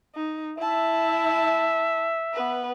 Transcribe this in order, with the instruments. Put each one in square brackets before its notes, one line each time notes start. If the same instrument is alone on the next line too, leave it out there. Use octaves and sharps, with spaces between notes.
[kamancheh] D#4
[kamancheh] E4 A5 [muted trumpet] E5
[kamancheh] B3 B4